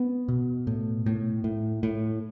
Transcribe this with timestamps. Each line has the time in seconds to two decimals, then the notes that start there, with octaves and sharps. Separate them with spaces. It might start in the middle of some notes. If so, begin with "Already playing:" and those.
Already playing: B3
0.28 B2
0.67 A2
1.06 A2
1.44 A2
1.83 A2